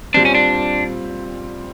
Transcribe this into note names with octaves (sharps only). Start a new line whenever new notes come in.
A#2 G3 C4 D4
C#4
D4